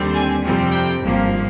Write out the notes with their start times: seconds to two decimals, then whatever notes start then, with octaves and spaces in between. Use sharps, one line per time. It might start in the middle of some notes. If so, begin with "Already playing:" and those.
Already playing: D#2 D3 G3 C4
0.14 G#5
0.44 F2 C3 G3 C4
0.72 G5
1.01 G#1 G2 F3 A#3